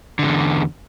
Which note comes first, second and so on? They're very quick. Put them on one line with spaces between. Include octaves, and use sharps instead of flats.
D3 G2 E2